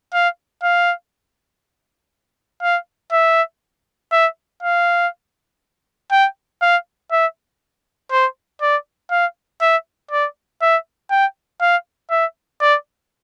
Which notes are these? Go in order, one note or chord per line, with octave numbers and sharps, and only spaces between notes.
F5
F5
F5
E5
E5
F5
G5
F5
E5
C5
D5
F5
E5
D5
E5
G5
F5
E5
D5